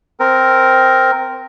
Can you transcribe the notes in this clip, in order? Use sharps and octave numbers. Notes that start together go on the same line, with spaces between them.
C4 A#4